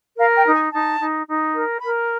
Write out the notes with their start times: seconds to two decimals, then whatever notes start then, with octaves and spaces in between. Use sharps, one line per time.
0.17 A#4 F5
0.35 G5
0.44 D#4
0.53 G#5
0.71 D#4 A5
0.98 D#4
1.26 D#4
1.53 A#4
1.80 A#4 B5